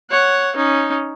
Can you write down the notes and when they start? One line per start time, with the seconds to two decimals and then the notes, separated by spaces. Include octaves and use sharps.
0.10 C#5 F#5
0.56 C#4 D#4